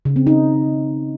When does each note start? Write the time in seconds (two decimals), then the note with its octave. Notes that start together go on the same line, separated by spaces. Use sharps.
0.05 C#3
0.16 C4
0.27 D#4